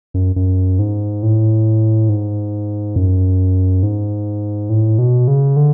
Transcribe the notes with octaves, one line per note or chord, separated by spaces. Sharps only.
F#2
F#2
G#2
A2
G#2
F#2
G#2
A2
B2
C#3
D3